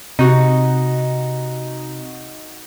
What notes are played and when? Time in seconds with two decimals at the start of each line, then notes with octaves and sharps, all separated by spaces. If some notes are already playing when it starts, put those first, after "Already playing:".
0.19 C3 D#4 F#4